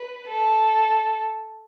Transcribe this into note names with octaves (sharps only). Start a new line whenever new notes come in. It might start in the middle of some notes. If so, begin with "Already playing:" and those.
Already playing: B4
A4